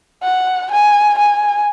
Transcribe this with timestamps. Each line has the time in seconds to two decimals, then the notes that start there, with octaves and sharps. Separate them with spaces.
0.23 F#5
0.71 G#5
1.18 G#5